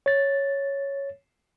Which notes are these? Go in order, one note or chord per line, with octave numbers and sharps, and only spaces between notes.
C#5 A6